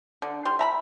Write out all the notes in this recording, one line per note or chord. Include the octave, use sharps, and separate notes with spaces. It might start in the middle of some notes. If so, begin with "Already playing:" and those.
D3
G3 C6
E5 A#5 B5